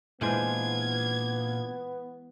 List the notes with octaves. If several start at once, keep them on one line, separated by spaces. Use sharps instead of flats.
A#2 E3 G#3 B3 D4 F4 C5 G#6